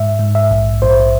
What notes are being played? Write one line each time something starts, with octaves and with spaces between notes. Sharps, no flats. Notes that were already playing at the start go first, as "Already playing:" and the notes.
Already playing: G#2 E5
G#2
E5
A#1
A#1 C5